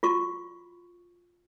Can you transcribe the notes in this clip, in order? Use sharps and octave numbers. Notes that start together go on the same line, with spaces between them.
F4 F#4 C#6